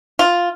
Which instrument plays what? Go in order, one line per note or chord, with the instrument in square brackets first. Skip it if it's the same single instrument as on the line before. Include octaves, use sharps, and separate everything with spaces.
[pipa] F4